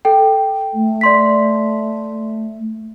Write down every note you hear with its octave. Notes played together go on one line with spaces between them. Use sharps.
A4 G5
A3
D5 C6 B6